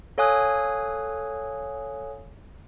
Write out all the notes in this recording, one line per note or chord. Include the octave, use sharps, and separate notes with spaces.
A4 C#5 F5 G#5 D#6 F#6